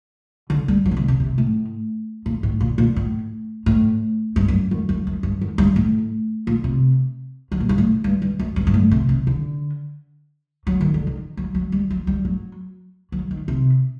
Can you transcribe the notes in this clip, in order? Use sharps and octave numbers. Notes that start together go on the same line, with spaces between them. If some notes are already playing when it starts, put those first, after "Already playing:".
D3
G3
F#3
C3
D3
C3
C3
A2
A#2
A2
A#2
A#2
A2
A2
G2
F#2
F#2
F#2
F#2
G2
F#2
G2
A2
A#2
C3
F#3
A#2
G2
A2
G2
G2
F#2
G2
G2
A2
C3
C3
D3
F#3
D#3
D3
D#3
F#3
F#3
G3
F#3
G3
F#3
F#3
D#3
C3